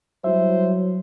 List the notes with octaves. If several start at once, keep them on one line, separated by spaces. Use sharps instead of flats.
F#3 G3 E4 C5 E5